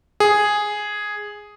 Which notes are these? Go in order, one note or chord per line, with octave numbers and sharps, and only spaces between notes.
G#4